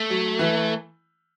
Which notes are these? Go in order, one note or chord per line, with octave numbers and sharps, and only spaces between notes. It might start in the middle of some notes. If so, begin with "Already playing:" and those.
Already playing: A3
F#3
E3